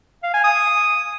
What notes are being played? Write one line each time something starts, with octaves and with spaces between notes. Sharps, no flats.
F5
G#5
D#6